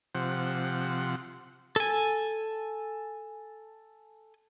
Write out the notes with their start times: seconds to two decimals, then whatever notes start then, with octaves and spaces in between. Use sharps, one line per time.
0.15 C3 F3 F#5
1.76 A4 G#5